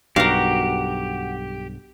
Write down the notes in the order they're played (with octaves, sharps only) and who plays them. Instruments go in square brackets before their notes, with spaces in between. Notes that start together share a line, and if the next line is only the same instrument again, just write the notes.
[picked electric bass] B1 G2 [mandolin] F#4 [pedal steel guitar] G4 [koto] A#4 F5